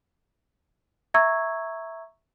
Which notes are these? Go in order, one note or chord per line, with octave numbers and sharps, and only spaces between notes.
E5 A#5 C#6 E6 G#6